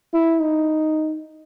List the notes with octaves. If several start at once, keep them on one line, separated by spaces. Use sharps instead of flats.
E4
D#4